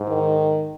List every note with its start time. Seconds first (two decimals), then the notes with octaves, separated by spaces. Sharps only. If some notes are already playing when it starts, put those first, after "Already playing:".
Already playing: G#2
0.09 D#3